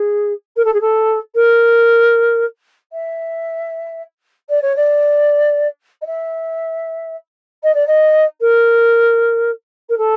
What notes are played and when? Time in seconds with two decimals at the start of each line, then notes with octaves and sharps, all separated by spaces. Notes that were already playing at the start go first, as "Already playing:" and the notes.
Already playing: G#4
0.56 A#4
0.65 A4
0.73 G#4
0.81 A4
1.35 A#4
2.92 E5
4.49 D5
4.62 C#5
4.76 D5
6.01 D#5
6.06 E5
7.63 D#5
7.74 D5
7.87 D#5
8.41 A#4
9.89 A#4
9.98 A4